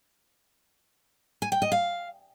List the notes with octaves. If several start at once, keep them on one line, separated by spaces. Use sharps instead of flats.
G#5
G5
D#5
F5